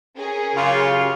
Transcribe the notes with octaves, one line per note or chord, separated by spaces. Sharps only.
C#4 G#4 A#4
F#2 C#3 F4 G4 F5